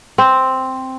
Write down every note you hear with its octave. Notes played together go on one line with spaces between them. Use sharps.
C4